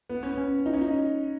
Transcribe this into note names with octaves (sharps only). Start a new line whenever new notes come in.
B3
C#4
C#4
D#4
C#4
D#4